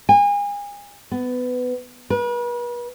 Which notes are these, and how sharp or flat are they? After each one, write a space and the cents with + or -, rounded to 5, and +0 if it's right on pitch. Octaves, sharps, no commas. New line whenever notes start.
G#5 -35
B3 +20
B4 -40